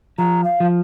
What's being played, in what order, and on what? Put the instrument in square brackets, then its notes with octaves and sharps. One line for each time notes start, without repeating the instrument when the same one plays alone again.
[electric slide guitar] F3 [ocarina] A#5
[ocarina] F5
[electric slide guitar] F3